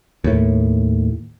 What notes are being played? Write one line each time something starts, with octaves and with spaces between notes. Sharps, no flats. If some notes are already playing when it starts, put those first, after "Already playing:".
D#2 A2